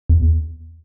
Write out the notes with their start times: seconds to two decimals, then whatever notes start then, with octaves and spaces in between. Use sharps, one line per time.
0.09 E2